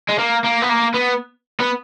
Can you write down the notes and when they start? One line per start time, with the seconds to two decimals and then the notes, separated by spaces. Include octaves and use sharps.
0.09 G#3
0.19 A#3
0.44 A#3
0.62 B3
0.69 A#3
0.94 B3
1.60 B3